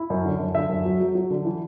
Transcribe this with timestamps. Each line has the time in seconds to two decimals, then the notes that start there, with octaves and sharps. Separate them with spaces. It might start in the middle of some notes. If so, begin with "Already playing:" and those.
Already playing: E4
0.10 F#2
0.25 D3
0.40 F#2
0.55 D3 E5
0.69 F#2
0.85 F#3
1.00 F#3
1.15 F#3
1.30 D3
1.45 E3